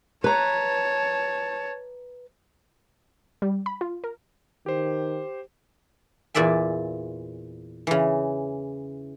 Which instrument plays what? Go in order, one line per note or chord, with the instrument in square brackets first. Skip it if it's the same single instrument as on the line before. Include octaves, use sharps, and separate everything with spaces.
[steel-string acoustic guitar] B4 A#5 [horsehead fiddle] C#5 A5
[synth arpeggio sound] G3
B5
F4
A#4
[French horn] D#3 [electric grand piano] G4 C5
[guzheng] E2 A#2 D5 E5 G#5
C#3 E3